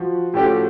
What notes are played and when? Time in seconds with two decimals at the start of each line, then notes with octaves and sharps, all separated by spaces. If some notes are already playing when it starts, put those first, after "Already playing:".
Already playing: F3 F#4
0.34 A2 F3 A3 C#4 F#4 G4